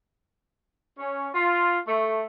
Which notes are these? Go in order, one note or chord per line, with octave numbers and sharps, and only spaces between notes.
C#4
F4
A3